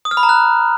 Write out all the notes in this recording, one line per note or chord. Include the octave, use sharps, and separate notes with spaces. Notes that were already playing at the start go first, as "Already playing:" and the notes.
D#6
F6
B5
A#5
F#6